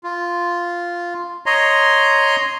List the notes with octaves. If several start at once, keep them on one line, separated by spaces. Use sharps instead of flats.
F4
C#5 D#5 A#5 C6